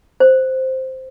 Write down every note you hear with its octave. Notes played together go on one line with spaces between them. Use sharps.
C5